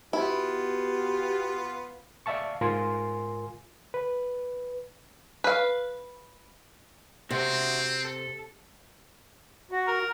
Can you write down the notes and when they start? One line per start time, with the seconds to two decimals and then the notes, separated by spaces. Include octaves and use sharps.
0.13 B2 B3 E4 F4 G4
2.26 D5 E5 F5 A5 C#6
2.61 G#2 F4 A#4 G#5 C6
3.94 B4
5.44 B4 F5
7.31 C3 C4 F#4 E5
8.05 A4
9.71 F#4
9.88 A#4